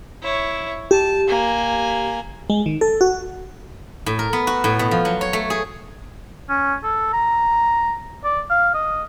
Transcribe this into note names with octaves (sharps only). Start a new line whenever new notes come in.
E4 C#5
G4 A5
A#3 G#5
G#3
D#3
A4
F#4
A2
A#4
B3
F#4
A2
B2
F3
F#3
C#5
A3
G#4
C#4
A4
A#5
D5
F5
D#5